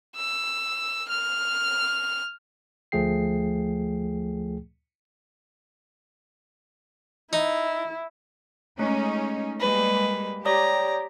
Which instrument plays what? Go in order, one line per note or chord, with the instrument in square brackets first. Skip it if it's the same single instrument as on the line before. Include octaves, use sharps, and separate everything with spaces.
[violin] E6
F6
[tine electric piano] D2 F3 A3 G#4 G5 C7
[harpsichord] D#4 [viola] E4
[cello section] G#3 C#4 D#4 [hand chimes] A3
[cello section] G3 G#3 A#3 [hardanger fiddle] B4
[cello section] G4 [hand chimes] C#5 D5 D#6 [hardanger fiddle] A#5